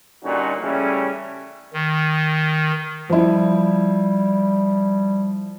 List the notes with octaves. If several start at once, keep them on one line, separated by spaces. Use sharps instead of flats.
A#2 D3 G3 C#4 D#4 F#4
C#3 E3 G3 A3 C#4
D#3
F3 G3 E4